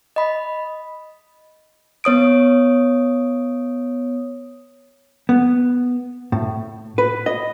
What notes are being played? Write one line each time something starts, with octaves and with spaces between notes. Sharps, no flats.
D#5 B5
B3 C#5 D#6 D7
B3
A2
B4
D#5